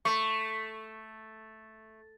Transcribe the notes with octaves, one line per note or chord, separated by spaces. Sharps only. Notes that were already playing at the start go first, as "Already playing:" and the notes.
A3 C#6